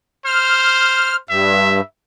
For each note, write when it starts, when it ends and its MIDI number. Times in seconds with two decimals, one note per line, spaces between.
0.25 1.18 72
0.25 1.16 89
1.30 1.81 43
1.30 1.84 76